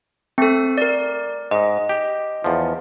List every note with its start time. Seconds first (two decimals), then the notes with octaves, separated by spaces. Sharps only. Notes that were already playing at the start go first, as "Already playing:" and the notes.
0.38 A3 C4 A4
0.78 A#4 D5
1.51 G#2 D#5
1.89 G4
2.44 E2 F3